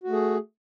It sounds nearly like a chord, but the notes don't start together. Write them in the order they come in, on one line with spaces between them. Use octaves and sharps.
F#4 A3 G#4